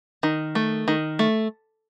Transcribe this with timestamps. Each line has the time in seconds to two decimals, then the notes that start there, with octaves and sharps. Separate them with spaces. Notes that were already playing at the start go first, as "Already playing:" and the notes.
0.23 D#3
0.55 A3
0.88 D#3
1.19 A3